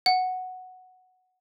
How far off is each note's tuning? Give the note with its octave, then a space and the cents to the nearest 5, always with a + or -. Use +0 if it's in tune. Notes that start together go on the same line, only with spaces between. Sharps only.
F#5 +0